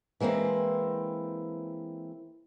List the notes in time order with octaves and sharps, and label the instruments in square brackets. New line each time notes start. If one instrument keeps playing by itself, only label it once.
[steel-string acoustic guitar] E3 G#3 A#3 C4 E4